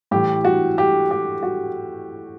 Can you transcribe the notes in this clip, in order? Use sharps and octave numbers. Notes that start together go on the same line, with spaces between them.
A2 E3 G4
F#4
G4
G4
F#4